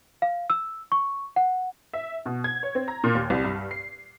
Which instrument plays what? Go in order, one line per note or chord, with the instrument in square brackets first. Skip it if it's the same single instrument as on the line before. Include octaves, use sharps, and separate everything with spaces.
[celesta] F5
E6
C#6
F#5
[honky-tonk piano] E5
B2
G#6
C#5
C4
A#5
A#2
D#2
C2
G2
C7